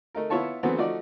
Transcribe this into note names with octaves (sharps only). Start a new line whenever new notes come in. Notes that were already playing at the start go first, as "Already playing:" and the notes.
A3 D#4 A#4
B3 E4 F4 C#5 A5
D3 E3 F#3 A3 B3 C4
F3 A3 D#4 F#4 D5